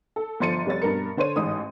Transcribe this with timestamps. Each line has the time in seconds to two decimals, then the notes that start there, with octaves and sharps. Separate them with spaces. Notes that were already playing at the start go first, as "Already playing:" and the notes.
0.16 A4
0.40 G1 F3 C6 A6 C#7 D#7
0.66 F1 G3 C#5 A6
0.82 G2 B2 A#4 C#7
1.17 D3 C5 C#5 D#7
1.36 A1 G#2 D#6